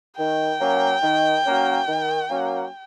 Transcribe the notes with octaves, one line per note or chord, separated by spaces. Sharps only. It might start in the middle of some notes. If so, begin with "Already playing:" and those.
D#3 G5
F#3 A#3 C#4
D#3
F#3 A#3 C#4
D#3
F#3 A#3 C#4